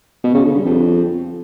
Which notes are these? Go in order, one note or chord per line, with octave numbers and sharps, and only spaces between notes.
B2
C#3
D3
G2
F2